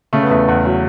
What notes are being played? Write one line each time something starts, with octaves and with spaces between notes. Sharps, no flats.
C#3 A3
B3
E2 A3
E2
F#3